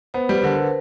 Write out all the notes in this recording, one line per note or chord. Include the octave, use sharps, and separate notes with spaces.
B3 C5
G3 B4
D3 A#4